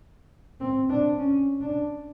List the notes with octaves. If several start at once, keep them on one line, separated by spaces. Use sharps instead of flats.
C4
D4
C#4
D4